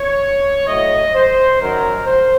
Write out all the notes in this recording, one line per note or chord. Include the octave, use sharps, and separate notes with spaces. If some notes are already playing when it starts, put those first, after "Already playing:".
Already playing: C#5
A2 F#3 D#5
C5
F#2 D#3 F#3 A#4
C5